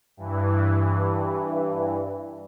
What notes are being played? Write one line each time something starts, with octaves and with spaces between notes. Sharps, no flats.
G2 E3